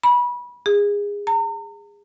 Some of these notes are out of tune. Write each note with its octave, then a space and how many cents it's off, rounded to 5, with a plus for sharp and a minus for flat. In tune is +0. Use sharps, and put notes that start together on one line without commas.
B5 -25
G#4 -25
A#5 -40